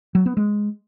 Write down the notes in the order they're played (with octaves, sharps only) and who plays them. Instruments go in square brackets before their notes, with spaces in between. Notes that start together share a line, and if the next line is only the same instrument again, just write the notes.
[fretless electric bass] F#3
B3
G#3